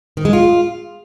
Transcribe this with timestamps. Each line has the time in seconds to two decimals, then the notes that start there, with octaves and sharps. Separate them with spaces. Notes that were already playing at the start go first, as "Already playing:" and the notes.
0.17 D#3
0.25 G#3
0.33 F4